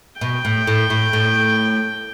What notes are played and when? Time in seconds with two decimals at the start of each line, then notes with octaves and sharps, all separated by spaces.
0.21 B2 G5
0.45 A2
0.67 A2
0.90 A2
1.13 A2